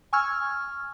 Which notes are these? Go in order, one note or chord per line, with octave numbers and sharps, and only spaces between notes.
G#5 C#6 E6 F6 G#6